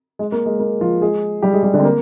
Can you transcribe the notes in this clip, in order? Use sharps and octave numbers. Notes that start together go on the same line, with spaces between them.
G#3
A#3
G#3
A#3
F3 F4
G#3 G#4
G3 G4
G#3 G#4
G3 G4
D3 D4
C4
A#3